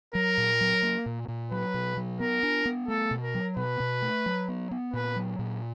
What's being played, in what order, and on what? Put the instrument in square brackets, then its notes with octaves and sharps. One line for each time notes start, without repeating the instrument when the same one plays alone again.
[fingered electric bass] F#3 [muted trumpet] A#4
[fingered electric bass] A#2
F#3
A#3
A#2
A#2
[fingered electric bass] F#3 [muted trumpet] B4
[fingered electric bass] B2
F#3
[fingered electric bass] B3 [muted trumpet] A#4
[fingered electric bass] D4
B3
[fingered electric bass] A3 [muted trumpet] A4
[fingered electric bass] B2
[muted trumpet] A#4
[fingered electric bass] F#3
[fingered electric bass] B2 [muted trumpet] B4
[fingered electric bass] B2
A3
F#3
B3
B3
[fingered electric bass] A#2 [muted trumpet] B4
[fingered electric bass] F#3
A#2